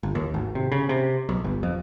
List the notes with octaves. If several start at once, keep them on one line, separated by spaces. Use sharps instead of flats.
G1
D#2
G#1
C3
C#3
C3
B1
G1
F2